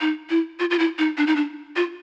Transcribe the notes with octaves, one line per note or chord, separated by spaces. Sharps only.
D#4
E4
F4
F4
E4
D#4
D4
D#4
D4
F4